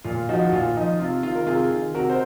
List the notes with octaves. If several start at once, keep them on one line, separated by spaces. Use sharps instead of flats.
A#2 F4
F3 D#4 F#4
F#4
A#2 F4
F3 D#4
C3 F4
D#3 F4
A#4
C3 F4 G#4
D#3
C3 F#4 A#4
C5